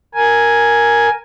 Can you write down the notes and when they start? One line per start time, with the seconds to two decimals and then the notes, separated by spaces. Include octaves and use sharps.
0.14 A#4 G#5